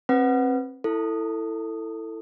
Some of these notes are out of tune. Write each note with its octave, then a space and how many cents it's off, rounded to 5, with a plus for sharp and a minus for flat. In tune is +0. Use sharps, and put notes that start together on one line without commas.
C4 +30 B4 +0 F#5 +0
E4 +0 A4 +20